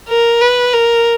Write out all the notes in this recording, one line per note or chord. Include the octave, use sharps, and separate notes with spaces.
A#4
B4
A#4